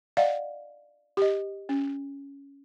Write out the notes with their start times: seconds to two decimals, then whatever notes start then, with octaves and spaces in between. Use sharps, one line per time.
0.17 D5 D#5 F5 F#5
1.17 G4 D#5
1.69 C#4